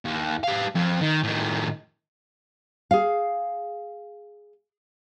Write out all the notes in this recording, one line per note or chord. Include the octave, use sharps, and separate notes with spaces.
D#2
G3 F5
F2
D#3
A2 D#3
G#4 F5